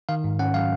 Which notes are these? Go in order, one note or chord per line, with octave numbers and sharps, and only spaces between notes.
D#3 F5
G#2
C#4 F#5
F#3 F5